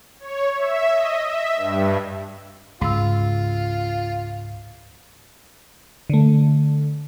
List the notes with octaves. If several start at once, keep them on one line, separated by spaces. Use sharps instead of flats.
C#5
E5
D#5
E5
G2
C#2 G#2 F4 E6
D3 A3